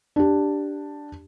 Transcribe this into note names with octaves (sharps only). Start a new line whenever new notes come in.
D4 G4